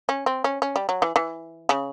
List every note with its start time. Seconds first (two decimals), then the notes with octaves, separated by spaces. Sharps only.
0.09 C#4
0.26 C4
0.44 C#4
0.62 C#4
0.76 G3
0.89 F#3
1.02 E3
1.16 E3
1.69 C#3